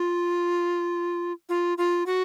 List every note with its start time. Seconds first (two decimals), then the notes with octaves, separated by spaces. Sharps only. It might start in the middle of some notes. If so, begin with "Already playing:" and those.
Already playing: F4
1.49 F4
1.78 F4
2.06 F#4